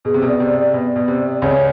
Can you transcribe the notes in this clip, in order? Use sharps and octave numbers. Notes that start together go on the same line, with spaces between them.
B2 G#4
C3
B2
D5
C3
D5
B2
B2
C3
C#2 C#3 C#5